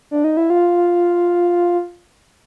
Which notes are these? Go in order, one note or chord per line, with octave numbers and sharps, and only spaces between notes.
D4
D#4
E4
F4